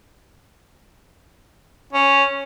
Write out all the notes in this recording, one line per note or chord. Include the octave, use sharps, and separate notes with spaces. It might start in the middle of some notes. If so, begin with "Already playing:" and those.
C#4